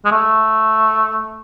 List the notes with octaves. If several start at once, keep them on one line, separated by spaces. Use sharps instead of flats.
G#3
A3